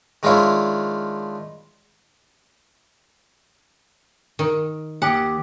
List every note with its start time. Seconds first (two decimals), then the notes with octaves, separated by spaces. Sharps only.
0.23 D#3 G#3 D4 E4 F4 C#5
4.39 D#3
5.02 D#2 G4 F#5